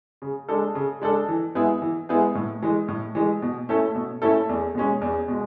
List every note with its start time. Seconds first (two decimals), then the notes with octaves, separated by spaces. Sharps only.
0.22 C#3
0.49 G#3 D4 A4
0.75 C#3
1.01 G#3 D4 A4
1.28 E3
1.55 G#3 B3 E4 G#4
1.82 E3
2.09 G#3 B3 E4 G#4
2.35 A2
2.62 E3 G#3
2.88 A2
3.15 E3 G#3
3.42 B2
3.69 A3 C#4 E4 A4
3.95 B2
4.22 A3 C#4 E4 A4
4.49 E2
4.75 B2 G#3 C#4
5.01 E2
5.28 B2 G#3